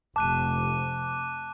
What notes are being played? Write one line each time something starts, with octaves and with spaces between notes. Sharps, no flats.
F1 C3 A5 D6 F#6 D#7